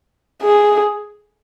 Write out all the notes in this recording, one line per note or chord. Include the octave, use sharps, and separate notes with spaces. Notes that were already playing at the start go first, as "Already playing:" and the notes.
G#4